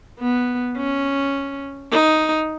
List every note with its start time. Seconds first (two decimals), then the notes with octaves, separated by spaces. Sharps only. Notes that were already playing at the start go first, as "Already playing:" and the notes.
0.19 B3
0.77 C#4
1.92 D#4